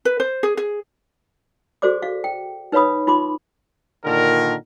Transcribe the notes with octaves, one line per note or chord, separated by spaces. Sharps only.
B4
C5
G#4
G#4
F#4 G#4 A4 C5 D5 D6
F5
G5
D#4 B4 C#5 F5 B5 D#6
D#4 F4 B5 C6 D6
A#2 D3 D#3 A#4